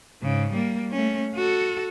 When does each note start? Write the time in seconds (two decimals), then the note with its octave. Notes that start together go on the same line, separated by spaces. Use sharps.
0.22 G#2 C#3
0.53 G3 A#3
0.92 A3 C#4
1.35 F#4 A4